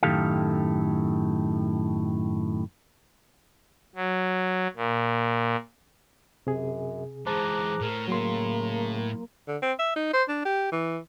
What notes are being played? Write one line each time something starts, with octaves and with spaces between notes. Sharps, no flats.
F#2 A2 D#3 G4 A4 F5
F#3
A#2
F#2 C3 G#4
G#2 E3 G#4 C5 A5 A#5 D6 F#6
A2 A#4
C#3 F#3 A#3 C6
D3
C4
E5
D#4
C5
D4
G4
E3